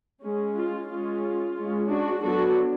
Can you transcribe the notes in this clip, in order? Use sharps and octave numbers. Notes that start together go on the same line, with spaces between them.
G#3 C#4
F4
G#3 C#4 F4
G#3 C#4
D4 F#4
F#3 B3 D4 F#4 A4